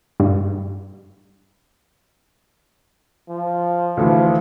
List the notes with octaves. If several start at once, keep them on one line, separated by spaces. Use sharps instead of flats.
G2
F3
D2 E3 F3